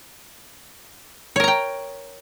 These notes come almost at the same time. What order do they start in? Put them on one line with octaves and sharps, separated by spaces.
C#5 A#4 A#5 G5